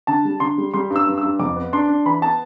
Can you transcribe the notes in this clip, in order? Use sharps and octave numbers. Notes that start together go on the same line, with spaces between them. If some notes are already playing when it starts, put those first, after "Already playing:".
D3 A5
G3
D3 C6
G3
G3 C6
G2
E6
G2
G2 E6
F2 D6
B3
D4 C6
D4
E3 B5
B3 A5